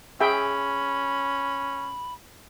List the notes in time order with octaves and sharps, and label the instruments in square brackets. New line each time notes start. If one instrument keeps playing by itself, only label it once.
[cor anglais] C#4 [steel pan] G#4 E5 G5 [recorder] B5